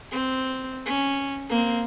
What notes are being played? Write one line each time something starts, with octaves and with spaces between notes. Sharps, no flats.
C4
C#4
A#3 C4